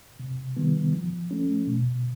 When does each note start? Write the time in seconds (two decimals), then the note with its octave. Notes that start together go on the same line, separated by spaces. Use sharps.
0.19 C3
0.57 D#3 G3 B3
0.93 F3
1.31 A3 C#4
1.67 B2